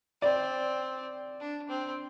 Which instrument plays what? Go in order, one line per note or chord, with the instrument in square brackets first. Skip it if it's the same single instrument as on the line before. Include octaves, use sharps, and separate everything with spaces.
[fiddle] C4 [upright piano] D5
[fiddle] D4
C4